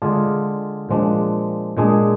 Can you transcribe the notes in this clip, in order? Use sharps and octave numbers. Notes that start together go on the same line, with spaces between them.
D3 G#3 D4 F4 G#4
A#2 F3 G#3 D4
A#2 G#3 D4 G#4